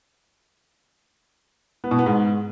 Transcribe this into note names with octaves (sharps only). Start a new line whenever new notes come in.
B3
B2
B3
G#2